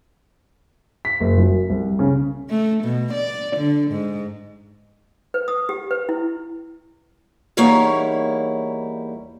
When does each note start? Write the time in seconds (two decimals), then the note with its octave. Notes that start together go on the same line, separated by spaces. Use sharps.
1.05 B6
1.20 F#1
1.37 F#2
1.70 C2
1.99 C#3
2.50 A3
2.84 B2
3.14 D5
3.56 D3
3.91 G#2
5.34 B4
5.48 D#6
5.69 G4
5.91 B4
6.09 E4
7.57 E2 G3 A#3 D#4 E4 C#5